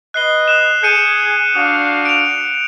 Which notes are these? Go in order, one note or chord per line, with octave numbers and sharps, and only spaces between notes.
B4 D#5 F#6 C7 G7
D#6 F#6 E7
G#4 G6 C#7 D#7
D4 F#4 F5 D#6
D7 F7